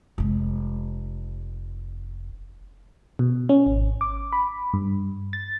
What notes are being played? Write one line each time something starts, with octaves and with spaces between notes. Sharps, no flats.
F1 G#3
B2
C#4
G#1
D6
B5
G2
A6